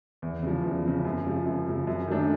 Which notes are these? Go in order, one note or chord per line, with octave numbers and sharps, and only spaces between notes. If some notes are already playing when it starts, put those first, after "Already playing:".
E2
C#3 F3
E2
C#3 F3
F#2
C#3 F3
F#2
C#3 F3
F#2
D#3 F#3 A3 D4